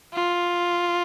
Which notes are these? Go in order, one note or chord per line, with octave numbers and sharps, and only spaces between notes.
F4